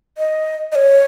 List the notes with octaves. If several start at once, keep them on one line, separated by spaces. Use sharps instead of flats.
D#5
D#5
C#5